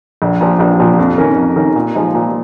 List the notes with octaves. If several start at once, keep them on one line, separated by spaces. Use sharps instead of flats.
A#1
A#2 F3
A#1
A#2 F3
F2
D#3 C#4 A#4
F2
D#3 C#4 A#4
A#2
F3 G#3 D#4
A#2